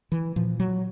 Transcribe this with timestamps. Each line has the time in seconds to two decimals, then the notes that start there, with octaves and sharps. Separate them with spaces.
0.12 E3
0.36 A#2 F3
0.60 F#3